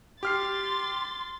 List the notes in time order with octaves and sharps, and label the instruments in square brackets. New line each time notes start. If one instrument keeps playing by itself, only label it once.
[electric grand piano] G4 F6 C7 [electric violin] C6 A6